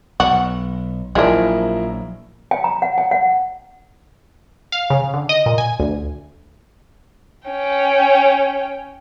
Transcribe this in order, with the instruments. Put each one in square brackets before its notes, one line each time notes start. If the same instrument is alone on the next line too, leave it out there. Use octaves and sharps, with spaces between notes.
[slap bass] B1 [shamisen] F#4
[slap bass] A#1 F#3 [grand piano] F3 E4 A#4 [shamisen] G#3 D4
[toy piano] G5
A#5
F#5
G5
F#5
[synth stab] F5
C#3
D3
D#5
A#2
G#5
D2
[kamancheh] C#4 G5